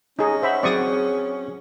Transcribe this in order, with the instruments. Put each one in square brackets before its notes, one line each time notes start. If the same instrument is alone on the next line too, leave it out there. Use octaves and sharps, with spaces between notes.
[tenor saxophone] C#4 [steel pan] D#4 G#4
[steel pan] C5 E5 B5 [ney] F#5
[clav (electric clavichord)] F#3 C4 [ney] G#4 [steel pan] D5 C#6 D#6